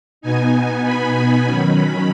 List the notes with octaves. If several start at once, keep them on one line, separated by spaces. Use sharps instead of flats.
B2 B3 D#4 G#5
G#5
B5
B5
D#3 F#3 C#4